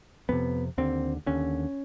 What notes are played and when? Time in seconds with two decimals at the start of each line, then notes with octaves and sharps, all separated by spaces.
0.29 F2 C3 B3
0.78 D#2 D3 C4
1.26 D#2 D3 C#4